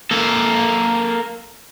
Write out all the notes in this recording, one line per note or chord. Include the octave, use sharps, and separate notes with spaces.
A#3 A4